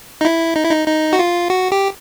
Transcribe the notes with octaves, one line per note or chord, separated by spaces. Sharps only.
D#4
E4
D#4
E4
D#4
D#4
F#4
F4
F#4
G4